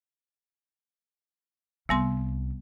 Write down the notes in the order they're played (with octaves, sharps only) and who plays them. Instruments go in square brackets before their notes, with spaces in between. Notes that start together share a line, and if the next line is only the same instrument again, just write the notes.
[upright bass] C2 [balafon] G3 B3 C6